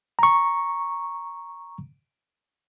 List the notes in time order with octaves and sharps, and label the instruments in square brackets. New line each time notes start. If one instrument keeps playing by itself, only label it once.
[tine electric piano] A#5 C#6